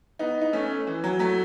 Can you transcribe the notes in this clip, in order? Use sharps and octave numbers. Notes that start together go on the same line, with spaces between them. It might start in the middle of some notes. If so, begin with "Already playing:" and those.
B3 D#4
D#4
A3 C#4
E3
F#3
F#3 A3